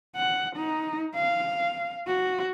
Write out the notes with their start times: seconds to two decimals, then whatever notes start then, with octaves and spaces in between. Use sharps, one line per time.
0.17 F#5
0.56 D#4
1.16 F5
2.08 F#4